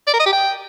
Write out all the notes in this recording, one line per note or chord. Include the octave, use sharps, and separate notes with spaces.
D5
A#4
D#5
G4
G5